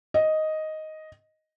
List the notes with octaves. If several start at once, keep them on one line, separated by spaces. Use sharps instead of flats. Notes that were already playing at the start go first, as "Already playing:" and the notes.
D#5